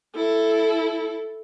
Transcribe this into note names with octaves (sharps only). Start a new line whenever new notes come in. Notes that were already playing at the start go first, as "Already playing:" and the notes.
E4 A4